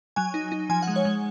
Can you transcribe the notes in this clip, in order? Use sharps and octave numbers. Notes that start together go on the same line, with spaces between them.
F#3 G#5
D#4
D#4
F3 G#5
F#5
G#3
C#5
G#3